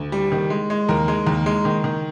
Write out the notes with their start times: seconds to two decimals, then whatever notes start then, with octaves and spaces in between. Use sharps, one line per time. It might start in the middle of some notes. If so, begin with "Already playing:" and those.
Already playing: D2
0.12 G3
0.32 D#3
0.50 G#3
0.70 G#3
0.89 D#2 A#4
1.08 G#3
1.27 D#2
1.46 G#3
1.65 D#3
1.84 D#3